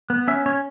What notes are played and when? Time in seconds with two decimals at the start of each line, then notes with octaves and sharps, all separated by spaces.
0.10 B3
0.28 C#4 E5
0.46 C#4 C#5